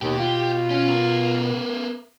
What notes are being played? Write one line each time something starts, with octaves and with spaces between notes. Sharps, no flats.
D#2 B2 G4
F4
C#4
B3 A#4